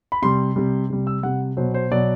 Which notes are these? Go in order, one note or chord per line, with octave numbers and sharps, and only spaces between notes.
B5
C3 G3 C6
C3 G3
C3 G3
E6
C3 G3 F#5
B2 F#3 C5
C5
B2 F#3 D5